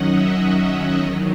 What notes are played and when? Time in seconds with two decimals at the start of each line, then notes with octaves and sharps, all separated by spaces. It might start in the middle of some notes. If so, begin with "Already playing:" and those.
Already playing: F#2 D#3 F#3 C#4 D#5 F#5
0.13 E5
0.98 E2 D#3 F#3 D#5